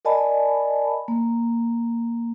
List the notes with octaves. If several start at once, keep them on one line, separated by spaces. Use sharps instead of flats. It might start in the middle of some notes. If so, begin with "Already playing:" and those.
A#4 D5 D#5 G#5 A5 B5
A#3